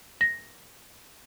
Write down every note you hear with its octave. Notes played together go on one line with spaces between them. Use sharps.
A#6